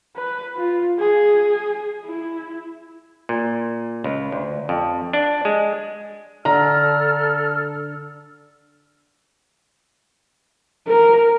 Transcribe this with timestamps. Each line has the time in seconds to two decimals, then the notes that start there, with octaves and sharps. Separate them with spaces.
0.16 B4
0.56 F4
0.99 G#4
2.06 E4
3.29 A#2
4.04 C#2
4.32 D2
4.69 F2
5.13 D4
5.45 G#3
6.45 D3 A4 A#5 F6
10.88 A#4